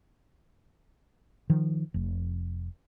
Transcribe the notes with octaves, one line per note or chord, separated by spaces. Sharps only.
D#3 F3
F1